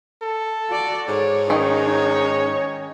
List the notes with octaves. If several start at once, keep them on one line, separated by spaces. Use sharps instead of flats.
A4
F#4 D5
G#2 C#5
D#3 C#4 D#4 C#5